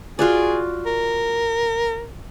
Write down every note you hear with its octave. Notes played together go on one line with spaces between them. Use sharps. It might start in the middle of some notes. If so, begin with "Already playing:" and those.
F4 F#4 G#4 D5
A#4